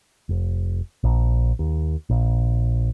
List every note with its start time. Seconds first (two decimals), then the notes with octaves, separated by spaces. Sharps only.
0.29 F1
1.04 A#1
1.59 D#2
2.10 A#1